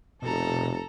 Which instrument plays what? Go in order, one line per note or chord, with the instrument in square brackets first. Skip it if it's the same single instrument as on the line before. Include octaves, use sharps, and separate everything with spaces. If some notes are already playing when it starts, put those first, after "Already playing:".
[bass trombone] F1 [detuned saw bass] B2 [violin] A4 A#5